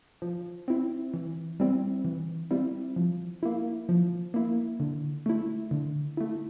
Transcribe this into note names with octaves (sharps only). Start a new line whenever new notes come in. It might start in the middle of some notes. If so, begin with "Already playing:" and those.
F3
C4 E4
E3
G3 C4 E4
E3
G3 C4 E4
F3
A#3 E4
F3
A#3 E4
D3
A3 E4
D3
A3 E4